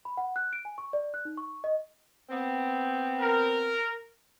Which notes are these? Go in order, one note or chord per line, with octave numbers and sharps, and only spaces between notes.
B5
F#5
F#6
D7
G#5
C#6
D5
F#6
D#4
C#6
D#5
B3 C4
A#4